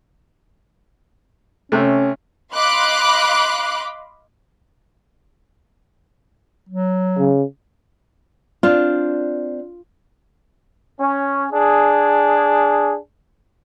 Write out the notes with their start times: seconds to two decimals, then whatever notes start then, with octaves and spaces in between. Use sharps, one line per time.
1.72 C3 A3 C#4
2.54 D#5 F5 B5 C6 D6 F#6
6.69 F#3
7.19 C#3
8.63 C4 D4 F4
11.00 C#4
11.52 D4 G#4